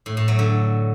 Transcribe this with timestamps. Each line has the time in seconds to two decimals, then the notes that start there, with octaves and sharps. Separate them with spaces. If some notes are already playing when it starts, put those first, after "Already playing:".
0.06 A2
0.17 A2
0.28 F#3
0.39 D3